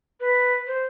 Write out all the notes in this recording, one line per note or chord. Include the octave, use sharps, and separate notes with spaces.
B4
C5